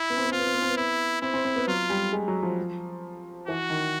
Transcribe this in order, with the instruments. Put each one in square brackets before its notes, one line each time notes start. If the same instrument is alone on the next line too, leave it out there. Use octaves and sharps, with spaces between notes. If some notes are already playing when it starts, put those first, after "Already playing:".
Already playing: [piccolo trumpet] E4
[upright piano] B3
C4
B3
[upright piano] C4 [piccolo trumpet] F4
[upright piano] B3
C4
B3
C4
B3
[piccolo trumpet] E4
[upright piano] C4 [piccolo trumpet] E4
[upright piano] C4
C4
B3
[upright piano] F#3 [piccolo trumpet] F4
[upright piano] G3
G#3
F#3
F3
[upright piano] E3 [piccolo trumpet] F#4
[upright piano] D#3